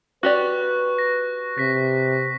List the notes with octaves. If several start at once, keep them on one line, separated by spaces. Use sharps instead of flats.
F#4 G4 B4 D5 C#6 F#6
A#6
C3 A#6 B6